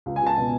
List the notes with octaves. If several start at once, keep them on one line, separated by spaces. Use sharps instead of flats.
C#2
G#5
C#2 A5
B2